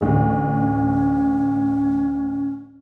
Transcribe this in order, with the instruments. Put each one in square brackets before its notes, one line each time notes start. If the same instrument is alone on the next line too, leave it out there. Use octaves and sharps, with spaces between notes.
[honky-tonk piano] A1 D2 [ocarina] C#4